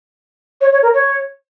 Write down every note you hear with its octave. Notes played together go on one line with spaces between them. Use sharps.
C#5
C#5
A#4
C#5